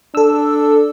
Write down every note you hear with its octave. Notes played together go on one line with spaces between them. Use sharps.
D4 A4 E6